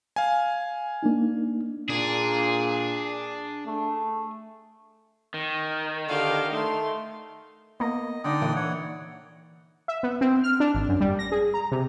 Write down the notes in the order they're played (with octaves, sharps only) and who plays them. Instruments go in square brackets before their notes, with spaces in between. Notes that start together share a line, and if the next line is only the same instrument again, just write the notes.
[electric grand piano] F5 G#5
[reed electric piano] A#3 D4 D#4
[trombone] A#2 [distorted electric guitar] D4 [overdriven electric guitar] G#4
[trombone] A3
[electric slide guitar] D#3
[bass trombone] D3 [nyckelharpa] G4 F5
[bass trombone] A3 [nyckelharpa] D#4 C6
[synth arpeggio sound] A#3 B3 [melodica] D#5
[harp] D3 D#4 [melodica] D5 G5 D#6
[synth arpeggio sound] A#2 [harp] E3
[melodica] C#5 F#5
[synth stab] E5
B3
C4
F6
D4
G#1
F#2
G3
A#6
G#4
A#5
C3